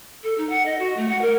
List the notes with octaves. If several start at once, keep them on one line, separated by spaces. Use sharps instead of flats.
A4
D#4
F#5
D#5
F#4
A3
F#5
A#4